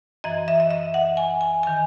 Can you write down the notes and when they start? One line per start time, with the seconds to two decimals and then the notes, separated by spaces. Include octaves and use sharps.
0.24 F#2 E3 D#5
0.48 E5
0.60 D#5
0.71 E5
0.94 F#5
1.17 G#5
1.41 G#5
1.63 D#3 G#5